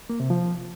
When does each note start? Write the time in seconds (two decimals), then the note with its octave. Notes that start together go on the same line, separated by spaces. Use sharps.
0.10 A#3
0.20 C3
0.30 F3